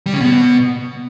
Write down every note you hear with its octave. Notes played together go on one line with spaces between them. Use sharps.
G3
C#3
B2